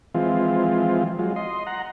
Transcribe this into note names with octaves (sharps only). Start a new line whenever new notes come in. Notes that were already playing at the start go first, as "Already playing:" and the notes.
E3 F3 G#3 C4 F4
F#3 G#3 F4
D#5 C6
F#5 A#5